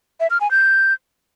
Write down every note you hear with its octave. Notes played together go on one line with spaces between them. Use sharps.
E5
F6
G#5
G6